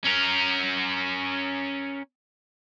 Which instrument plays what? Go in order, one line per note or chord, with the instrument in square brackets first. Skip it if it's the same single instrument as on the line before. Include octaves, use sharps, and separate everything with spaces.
[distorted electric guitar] C#4 A#4